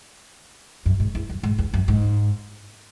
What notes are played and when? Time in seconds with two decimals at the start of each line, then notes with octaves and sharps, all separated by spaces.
0.86 F#2
1.00 G#2
1.15 E2
1.29 F#2
1.43 G#2
1.59 E2
1.74 F#2
1.88 G#2